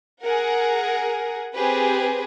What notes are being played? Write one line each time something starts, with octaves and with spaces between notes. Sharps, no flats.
G#4 A#4 F#5
C4 G4 G#4 B4